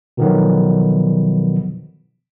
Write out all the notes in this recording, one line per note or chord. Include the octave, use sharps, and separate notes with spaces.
B2 D3 D#3 F3 F#3 B3